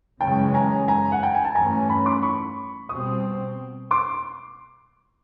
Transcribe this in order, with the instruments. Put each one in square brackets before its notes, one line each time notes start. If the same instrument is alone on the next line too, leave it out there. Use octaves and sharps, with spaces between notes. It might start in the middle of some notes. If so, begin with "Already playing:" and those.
[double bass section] F#2 C#3 E3 G#3 C#4 [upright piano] G5 A5
[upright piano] G#5 A#5
G#5 A#5
F#5
G5
G#5
A5
[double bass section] G2 E3 A3 C#4 [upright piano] G#5 A#5
[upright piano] A5 B5
C6 D6
B5 C#6
[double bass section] B2 G3 C4 [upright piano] C#6 D#6
[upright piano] C6 D6